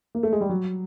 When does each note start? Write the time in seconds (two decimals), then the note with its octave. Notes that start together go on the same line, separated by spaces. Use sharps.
0.15 A#3
0.23 A3
0.32 G#3
0.41 G3
0.49 F#3